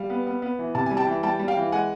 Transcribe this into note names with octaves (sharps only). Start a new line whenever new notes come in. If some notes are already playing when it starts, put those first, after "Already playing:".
Already playing: G3 F5
B3
B3
B3
E3
C3 A5
G3 G#5
G5 A5
E3
G3 G5 A5
G3
F5 G5
E3
G#3 F#5 G#5